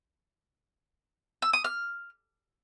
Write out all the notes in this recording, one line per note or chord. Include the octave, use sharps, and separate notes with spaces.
E6
D#6
F6